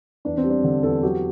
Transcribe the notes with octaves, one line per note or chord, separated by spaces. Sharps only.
E2 D4
C4
G3
D4
D3
E2 A4
F#3 G4